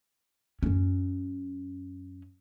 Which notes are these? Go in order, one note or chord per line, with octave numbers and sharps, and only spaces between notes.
F#2 C#4